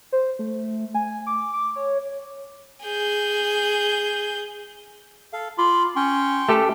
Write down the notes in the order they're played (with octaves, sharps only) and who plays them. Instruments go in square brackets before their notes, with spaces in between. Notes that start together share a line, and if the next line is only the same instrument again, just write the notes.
[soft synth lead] C5
A3
G#5
D6
D6
C#5
[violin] G#4 G6
[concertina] A4 F5
[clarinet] F4 [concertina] B5 C6 D6
[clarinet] C#4 [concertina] G5 C6 C#6
[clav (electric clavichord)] A3 G4 A4